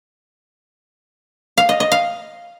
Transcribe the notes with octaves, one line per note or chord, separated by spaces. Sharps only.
F5
D#5
D#5
F5